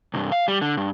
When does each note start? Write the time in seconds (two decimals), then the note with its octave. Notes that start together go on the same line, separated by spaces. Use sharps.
0.14 C2 G2
0.32 F5
0.48 G3
0.62 D3
0.77 G2